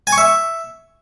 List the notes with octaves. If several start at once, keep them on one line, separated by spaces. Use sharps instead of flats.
G#5
C#6
E5